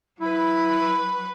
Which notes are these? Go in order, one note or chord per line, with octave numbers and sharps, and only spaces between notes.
F#3 E4 B4 B5